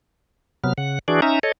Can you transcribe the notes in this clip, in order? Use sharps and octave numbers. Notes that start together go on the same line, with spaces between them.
C3 F#3 B3 F6
C#3 F#5
E3 D4 F#4 G#4 D5
C#4 D#4 E5 A#5
A4 C#5 D#5